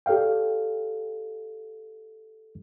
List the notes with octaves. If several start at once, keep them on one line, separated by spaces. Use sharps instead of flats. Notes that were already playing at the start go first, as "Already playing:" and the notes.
G4 A4 D5 F5 G5